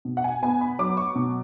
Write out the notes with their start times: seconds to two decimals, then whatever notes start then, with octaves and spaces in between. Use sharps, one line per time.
0.05 B2
0.17 F#5
0.24 G#5
0.43 B3 G#5
0.61 B5
0.79 F#3 D6
0.97 C#6
1.16 B2